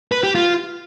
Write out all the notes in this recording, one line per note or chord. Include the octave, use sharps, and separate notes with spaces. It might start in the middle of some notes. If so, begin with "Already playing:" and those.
B4
G4
F4